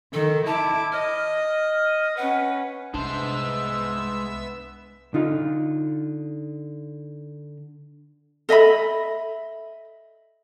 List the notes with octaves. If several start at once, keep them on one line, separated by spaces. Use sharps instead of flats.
D#3 A4
E4 A5 D6
D#5 F6
C#4 B4 F#5
C2 G#3 B3 D4 C5 E5 E6
D3 D#4 F4
A4 D#5 E5 B5